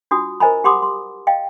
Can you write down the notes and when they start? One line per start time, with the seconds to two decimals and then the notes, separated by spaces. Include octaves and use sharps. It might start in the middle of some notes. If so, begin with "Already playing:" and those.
0.11 D4 F4 F#4 D#6
0.40 A#4 C5 D#5 G#5 A#5 B5
0.64 G4 F#5 B5 C6 D6 D#6
0.82 C6
1.27 D#5 F5 G5